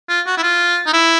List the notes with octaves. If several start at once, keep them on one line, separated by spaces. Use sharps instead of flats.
F4
F#4
E4
F4
D#4
E4